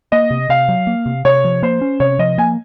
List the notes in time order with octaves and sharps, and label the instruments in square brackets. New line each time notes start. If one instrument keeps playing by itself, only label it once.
[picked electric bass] A#3 [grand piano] D#5
[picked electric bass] C3
[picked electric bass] C3 [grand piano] F5
[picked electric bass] F#3
A#3
C3
[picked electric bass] C3 [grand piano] C#5
[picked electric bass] F3
[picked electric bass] A#3 [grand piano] C5
[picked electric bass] C#4
[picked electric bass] C3 [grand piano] C#5
[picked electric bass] F3 [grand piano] D#5
[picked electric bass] A#3 [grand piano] G#5